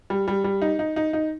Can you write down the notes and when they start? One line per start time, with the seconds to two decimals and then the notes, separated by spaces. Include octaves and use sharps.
0.10 G3
0.28 G3
0.44 G3
0.62 D#4
0.79 D#4
0.96 D#4
1.13 D#4